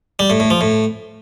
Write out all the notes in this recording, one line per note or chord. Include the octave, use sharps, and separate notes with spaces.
G3
A2
A2
F3
A2